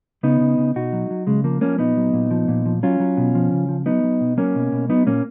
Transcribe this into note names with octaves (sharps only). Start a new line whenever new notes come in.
C#3 B3 D#4
C#3
C#3
B2 D#4 F#4
F#3
F#3
C#3 G#3
F3 A#3
F3 A#3 C#4
A#2 B3 D#4
F#3
A#2
F3
A#2
F3
F#3 C#4 F4
F#3
B2
F3
C#3
F3
F#3 B3 D#4
F#3
B2
F#3 A#3 C#4
B2
B2
F#3 B3 D#4
A#2 A#3 C#4